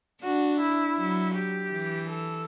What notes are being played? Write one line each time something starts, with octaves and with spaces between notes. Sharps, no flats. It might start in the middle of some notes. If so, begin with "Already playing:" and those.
D4 F#4
E4
F#3
G4
E3
A4